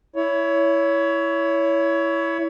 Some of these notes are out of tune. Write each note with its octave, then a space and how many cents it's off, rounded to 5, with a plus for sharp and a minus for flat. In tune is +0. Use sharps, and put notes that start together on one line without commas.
E4 +0 C#5 +20